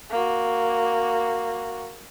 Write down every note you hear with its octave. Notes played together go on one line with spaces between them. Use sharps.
A#3 F#4